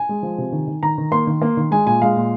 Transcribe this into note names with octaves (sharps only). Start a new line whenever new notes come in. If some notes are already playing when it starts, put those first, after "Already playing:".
Already playing: G#5
G#3
F3
C3
D#3
D#3
D#3 A#5
D#3
A#3 C6
D#3
A#3
D#3
G#3 G#5
A#2 G#5
G#3 F5
A#2